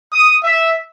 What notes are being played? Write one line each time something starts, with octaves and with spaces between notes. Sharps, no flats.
D#6
E5